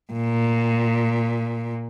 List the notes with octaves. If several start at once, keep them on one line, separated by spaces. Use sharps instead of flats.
A#2